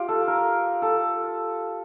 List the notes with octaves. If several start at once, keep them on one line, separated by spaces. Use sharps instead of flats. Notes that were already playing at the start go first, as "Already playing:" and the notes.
Already playing: F4 G4
A4
A#4
A4